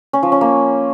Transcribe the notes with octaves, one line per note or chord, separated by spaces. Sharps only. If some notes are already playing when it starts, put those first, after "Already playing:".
C#4
F3
C#4
A#3